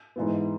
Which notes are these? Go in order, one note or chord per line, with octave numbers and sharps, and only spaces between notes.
G#2 E3 B3